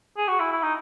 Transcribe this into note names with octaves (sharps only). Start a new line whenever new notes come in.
G#4
F#4
E4
E4
D#4